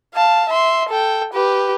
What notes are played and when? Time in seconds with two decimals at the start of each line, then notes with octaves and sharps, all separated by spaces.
0.14 F5 A5
0.49 E5 C6
0.89 A4 G5
1.33 G4 B4